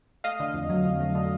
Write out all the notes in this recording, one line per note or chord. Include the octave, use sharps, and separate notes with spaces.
A3 D#5 F5
D3
F2
F#3
F2
A3
D3